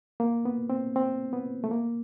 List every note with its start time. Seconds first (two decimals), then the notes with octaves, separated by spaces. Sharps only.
0.20 A#3
0.45 B3
0.70 C4
0.96 C4
1.33 B3
1.64 A3
1.71 A#3